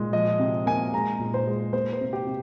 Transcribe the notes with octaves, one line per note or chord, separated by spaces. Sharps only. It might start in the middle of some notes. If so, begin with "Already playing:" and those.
Already playing: A#2 G#3
F3 D#5
C3
A#3 G#5
G#3 A#5
A#2
C5
G#3
A#3 C5
C5
C3
G4
C3